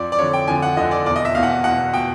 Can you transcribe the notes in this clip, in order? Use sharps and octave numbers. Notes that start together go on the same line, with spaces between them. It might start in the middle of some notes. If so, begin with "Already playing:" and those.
Already playing: F2 D5
D5
F2 D3 C#5
G5
F2 D3 G#5
F#5
F2 D3 D#5
D5
E2 B2 D5
D#5
E5
E2 B2 F5
F#5
F5
E2 B2 F#5
B2 G5